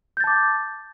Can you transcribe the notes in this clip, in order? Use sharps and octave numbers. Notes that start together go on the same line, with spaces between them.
A5 D6 G6 A6